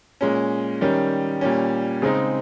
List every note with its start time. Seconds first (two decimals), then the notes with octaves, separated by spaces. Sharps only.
0.21 A#2 G#3 C#4
0.81 D#3 G3 C#4
1.41 A#2 G3 C#4
2.02 C#3 G#3 C4 D#4